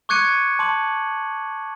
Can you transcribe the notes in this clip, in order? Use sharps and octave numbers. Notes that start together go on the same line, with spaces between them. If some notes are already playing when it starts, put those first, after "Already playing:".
C#6 D6 F#6 G#6 C#7 D#7
A5 C6 D6 F#7